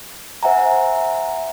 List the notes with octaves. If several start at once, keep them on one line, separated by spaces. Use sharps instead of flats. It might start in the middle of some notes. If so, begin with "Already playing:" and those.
C5 E5 F#5 G#5 A#5